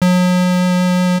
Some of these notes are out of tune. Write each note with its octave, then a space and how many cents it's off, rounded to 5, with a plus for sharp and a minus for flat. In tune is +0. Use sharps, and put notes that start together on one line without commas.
F#3 -40